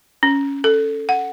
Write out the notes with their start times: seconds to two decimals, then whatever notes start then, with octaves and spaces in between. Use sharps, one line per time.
0.23 C#4
0.64 A4
1.09 F#5